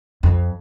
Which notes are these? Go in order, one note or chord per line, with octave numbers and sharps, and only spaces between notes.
F2